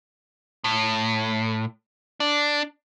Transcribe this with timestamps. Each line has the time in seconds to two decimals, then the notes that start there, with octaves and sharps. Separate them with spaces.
0.64 A2
2.20 D4